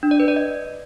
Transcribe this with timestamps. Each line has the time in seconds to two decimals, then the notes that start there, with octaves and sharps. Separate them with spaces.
0.03 D4
0.11 D5
0.20 B4
0.28 D5
0.36 D#5